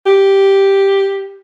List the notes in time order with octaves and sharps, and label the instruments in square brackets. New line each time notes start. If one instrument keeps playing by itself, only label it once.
[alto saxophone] G4